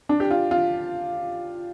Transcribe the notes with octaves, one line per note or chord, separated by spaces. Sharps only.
D4
G4
F4
F4